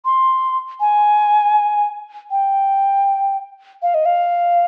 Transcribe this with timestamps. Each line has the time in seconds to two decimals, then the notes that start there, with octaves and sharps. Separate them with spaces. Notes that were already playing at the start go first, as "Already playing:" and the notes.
0.05 C6
0.80 G#5
2.31 G5
3.82 F5
3.94 D#5
4.06 F5